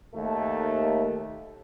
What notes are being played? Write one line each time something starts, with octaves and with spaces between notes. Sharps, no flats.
D#2 A3